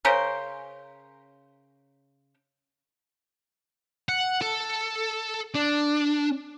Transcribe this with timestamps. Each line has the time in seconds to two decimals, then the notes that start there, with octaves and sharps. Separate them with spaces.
0.05 C#3 C#4 A#4 C5
4.09 F#5
4.41 A4
5.55 D4